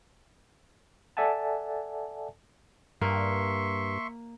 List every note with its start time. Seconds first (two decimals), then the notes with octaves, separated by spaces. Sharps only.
1.17 A4 D5 E5 F#5 G#5 A5
3.01 G2 A#3 E5 C6 C#6